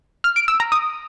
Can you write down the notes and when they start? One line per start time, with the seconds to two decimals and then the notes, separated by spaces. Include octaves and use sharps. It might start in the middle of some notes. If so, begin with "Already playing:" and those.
0.24 F6
0.36 D7
0.48 E6
0.60 A#5
0.72 D#6